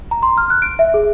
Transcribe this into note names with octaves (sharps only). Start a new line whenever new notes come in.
A#5
C6
F6
F#6
D7
E5
G#4